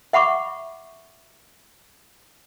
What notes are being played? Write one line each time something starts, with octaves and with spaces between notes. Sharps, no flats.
E5 F#5 B5 C#6 D6